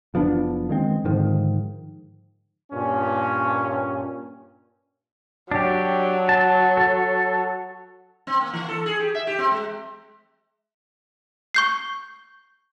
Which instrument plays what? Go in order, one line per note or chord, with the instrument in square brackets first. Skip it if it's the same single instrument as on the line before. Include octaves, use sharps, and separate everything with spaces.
[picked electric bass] F#1 F3 B3 D4
D#3 G#3 C4
G#2 D3 D#3 F3
[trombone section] G2 A#2 C#4
[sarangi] F#3 [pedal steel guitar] D4 G4
[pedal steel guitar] A5
A4
[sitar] C4
A#3
E3
A4
G#4
G4
E5
G4
C4
G#3
[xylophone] C#6 G6 C7